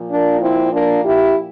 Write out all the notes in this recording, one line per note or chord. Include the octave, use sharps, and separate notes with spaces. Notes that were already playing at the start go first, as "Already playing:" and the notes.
Already playing: A#2 F3
A#3 D4
C4 E4
A#3 D4
E4 G4